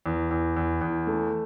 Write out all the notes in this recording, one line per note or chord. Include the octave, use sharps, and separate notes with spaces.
E2
E2
E2
E2
A3